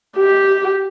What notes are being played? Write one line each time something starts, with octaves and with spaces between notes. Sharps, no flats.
G4